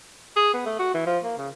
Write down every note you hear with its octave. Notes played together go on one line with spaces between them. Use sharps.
G#4
B3
A3
F#4
E3
F3
A#3
C#3